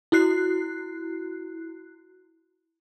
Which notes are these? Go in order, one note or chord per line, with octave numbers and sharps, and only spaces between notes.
E4 F#4 F#6 C7